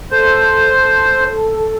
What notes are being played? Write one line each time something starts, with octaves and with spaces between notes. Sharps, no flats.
A4 C5